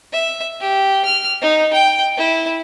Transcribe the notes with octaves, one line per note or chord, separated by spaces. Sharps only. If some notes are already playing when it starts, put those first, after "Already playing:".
E5
G4
F6
D#4
G5
E4